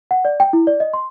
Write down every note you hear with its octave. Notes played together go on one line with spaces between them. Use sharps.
F#5
D5
G5
E4
D5
D#5
C6